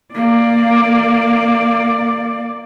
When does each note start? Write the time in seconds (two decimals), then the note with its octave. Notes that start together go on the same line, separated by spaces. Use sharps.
0.14 A#3 D5